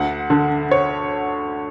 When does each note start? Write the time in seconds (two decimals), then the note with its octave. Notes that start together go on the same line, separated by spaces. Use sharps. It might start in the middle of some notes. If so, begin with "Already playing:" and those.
Already playing: D2 F#5
0.30 D3
0.71 C#5